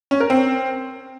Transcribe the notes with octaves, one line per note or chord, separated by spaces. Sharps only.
C#4
A#4
C4